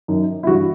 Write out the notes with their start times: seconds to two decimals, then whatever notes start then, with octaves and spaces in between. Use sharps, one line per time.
0.08 F#2 D#3
0.43 E4
0.47 G2 E3 F#4